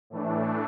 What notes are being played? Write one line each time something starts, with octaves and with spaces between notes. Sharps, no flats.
A2 E3 A3 D4